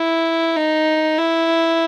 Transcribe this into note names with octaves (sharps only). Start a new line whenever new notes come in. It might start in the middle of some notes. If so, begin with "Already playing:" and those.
Already playing: E4
D#4
E4